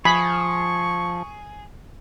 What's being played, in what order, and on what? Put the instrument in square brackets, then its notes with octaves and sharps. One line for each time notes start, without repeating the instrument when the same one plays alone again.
[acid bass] F3 [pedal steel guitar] G#4 [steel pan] B5 [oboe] C#6